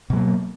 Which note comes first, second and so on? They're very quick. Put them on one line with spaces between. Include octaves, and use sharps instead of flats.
B2 F#3 A#3